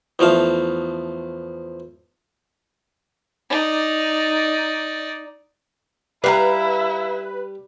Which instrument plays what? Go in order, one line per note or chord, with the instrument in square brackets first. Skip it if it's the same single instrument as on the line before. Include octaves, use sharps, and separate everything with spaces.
[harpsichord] E2 F3 A3 F5
[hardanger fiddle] D#4 D5
[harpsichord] G3 [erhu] E4 [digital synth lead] B4 [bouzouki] F5 G5 A#5